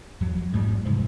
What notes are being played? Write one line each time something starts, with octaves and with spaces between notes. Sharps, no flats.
F2 F#3
A1 G#2 F#3 G3
C2 G#2 E3 F3